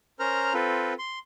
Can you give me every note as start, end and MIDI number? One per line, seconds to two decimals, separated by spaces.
0.20 0.53 61
0.20 0.53 70
0.20 0.53 72
0.20 0.53 82
0.20 0.53 89
0.54 0.93 60
0.54 0.93 65
0.54 0.93 69
0.54 0.93 71
0.99 1.19 84